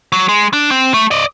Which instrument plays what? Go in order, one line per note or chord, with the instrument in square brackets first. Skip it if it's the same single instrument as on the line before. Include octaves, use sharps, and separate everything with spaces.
[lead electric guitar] F#3
G#3
D4
C4
A3
D5 D#5